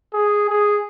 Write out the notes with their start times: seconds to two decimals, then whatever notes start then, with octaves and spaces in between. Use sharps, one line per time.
0.14 G#4
0.50 G#4